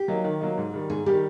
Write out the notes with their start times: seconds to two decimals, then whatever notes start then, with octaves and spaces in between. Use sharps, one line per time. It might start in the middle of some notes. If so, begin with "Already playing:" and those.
Already playing: G4
0.08 F#3 A#3 D#4
0.24 D#3
0.41 F#3 A#3 D#4
0.58 G#2
0.74 D#3 G3
0.90 G#2 G#4
1.06 D#3 G3 G4